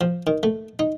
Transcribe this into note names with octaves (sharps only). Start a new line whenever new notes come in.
F3
D#3
A3
D#4